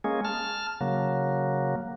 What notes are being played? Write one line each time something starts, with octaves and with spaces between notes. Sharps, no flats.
G#3 A#3 C#4 G#4
A5 F6
C#3 F#3 A#3